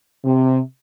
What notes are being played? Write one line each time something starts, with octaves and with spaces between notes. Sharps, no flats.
C3